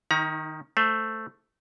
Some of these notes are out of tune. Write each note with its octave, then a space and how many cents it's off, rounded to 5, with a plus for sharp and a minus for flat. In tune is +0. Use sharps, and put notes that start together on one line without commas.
D#3 +0 D#4 +40 A#5 +30
A3 +5 C5 +0